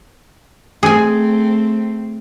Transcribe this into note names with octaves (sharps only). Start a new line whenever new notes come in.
A3 C4 G#4 G#5